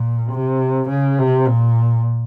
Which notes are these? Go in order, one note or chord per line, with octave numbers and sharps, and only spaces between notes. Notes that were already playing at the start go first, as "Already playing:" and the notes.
Already playing: A#2
C3
C#3
C3
A#2